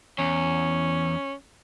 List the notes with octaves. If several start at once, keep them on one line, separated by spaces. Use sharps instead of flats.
E2 C#4